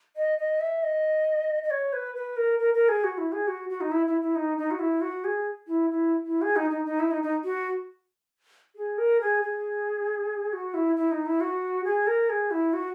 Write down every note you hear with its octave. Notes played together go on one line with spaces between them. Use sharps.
D#5
D#5
E5
D#5
D#5
C#5
B4
B4
A#4
A#4
A#4
G#4
F#4
E4
G#4
F#4
F#4
D#4
E4
E4
E4
D#4
D#4
F#4
E4
F#4
G#4
E4
E4
E4
G#4
D#4
D#4
D#4
E4
D#4
D#4
F#4
G#4
A#4
G#4
G#4
F#4
E4
E4
D#4
E4
F#4
G#4
A#4
G#4
E4
F#4